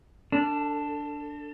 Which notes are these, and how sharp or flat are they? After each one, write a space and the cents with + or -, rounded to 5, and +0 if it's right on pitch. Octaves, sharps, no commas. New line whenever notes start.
D4 +0 A4 +40